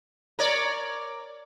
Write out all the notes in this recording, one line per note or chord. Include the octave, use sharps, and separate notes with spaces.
A#4 C#5 D5